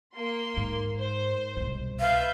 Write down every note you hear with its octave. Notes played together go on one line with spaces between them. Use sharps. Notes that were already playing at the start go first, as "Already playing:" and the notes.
A#3 C6
G#2
C5
C2 B2
B4 E5 F5 G6